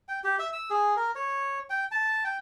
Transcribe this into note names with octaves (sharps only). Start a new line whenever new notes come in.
G5
G4
E5
E6
G#4
A#4
C#5
G5
A5
G5